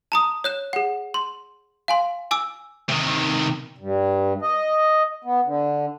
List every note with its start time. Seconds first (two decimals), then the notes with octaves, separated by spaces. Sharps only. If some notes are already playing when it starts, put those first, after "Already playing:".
0.12 A5 A#5 D#6
0.44 C#5 F#6 E7
0.73 G#4 F#5
1.14 C6
1.88 F5 G#5 C6
2.31 G#5 D6 E6
2.89 C3 D#3
3.76 G2
4.42 D#5
5.24 B3
5.45 D3